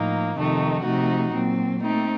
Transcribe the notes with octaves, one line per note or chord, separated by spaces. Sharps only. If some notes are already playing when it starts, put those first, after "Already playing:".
Already playing: A2 F3 A#3 D#4
F2 C3 D#3 A3 D#4
C3 F3 A3 D#4 F#4
A#2 F#3 C4
A3 C4 D#4